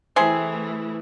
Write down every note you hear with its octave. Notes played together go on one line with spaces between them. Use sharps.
C3 E3 A3 C4 E4 G#4